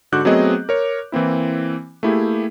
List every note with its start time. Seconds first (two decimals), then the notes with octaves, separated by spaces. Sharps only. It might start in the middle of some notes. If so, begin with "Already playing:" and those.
0.12 G#2 D3 F#4 D6 F#6 G6
0.25 F#3 A3 B3 C4 G#4 D#5
0.69 A#4 C#5
1.12 E3 A#3 C4 E4
2.03 A3 A#3 E4 G4 G#4